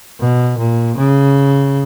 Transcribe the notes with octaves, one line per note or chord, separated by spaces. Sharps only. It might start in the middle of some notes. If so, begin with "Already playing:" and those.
B2
A#2
C#3